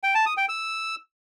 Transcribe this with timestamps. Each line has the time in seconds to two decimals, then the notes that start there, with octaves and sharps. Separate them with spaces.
0.03 G5
0.15 A5
0.26 D#6
0.37 G5
0.49 E6